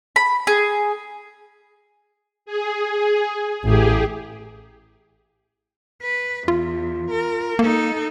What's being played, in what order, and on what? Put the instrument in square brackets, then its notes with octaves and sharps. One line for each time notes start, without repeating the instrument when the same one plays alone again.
[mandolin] B5
G#4
[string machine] G#4
[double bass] A1 [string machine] G4 G#4
[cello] B4
[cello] E2 [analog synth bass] F4
[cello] A#4
[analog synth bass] A#3 [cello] D#4 A4